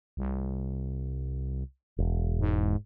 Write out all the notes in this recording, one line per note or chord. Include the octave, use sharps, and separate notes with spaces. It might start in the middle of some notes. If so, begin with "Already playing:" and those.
C2
E1
G#2